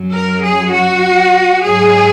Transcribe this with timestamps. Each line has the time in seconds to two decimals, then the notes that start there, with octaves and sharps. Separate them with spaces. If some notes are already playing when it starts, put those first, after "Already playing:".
Already playing: F#2 F#3
0.12 A#4
0.42 G#4
0.72 F#4
1.62 G#2 F#3 G#4